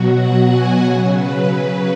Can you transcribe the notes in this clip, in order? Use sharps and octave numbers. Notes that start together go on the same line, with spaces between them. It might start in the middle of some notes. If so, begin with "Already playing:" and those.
Already playing: B2 F#3 F#4
F#5
G#5
C#3 F#3 F#5
B4
B4